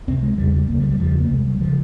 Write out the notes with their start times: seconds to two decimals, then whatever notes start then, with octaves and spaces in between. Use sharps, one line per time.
0.07 C#2 C3 C4
0.23 G#3
0.38 E2 C#3 G3
0.69 C#2 C#3 A#3
0.79 G3
0.90 G3
0.99 E2 C#3 F3
1.20 A#3
1.30 C2 C3 G#3
1.47 G3
1.61 C#3 F3